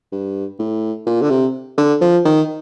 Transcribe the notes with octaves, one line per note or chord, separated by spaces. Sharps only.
G2
A2
A#2
D3
C3
D3
F3
D#3